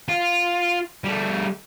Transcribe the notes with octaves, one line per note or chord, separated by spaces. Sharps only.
F4
G3 A3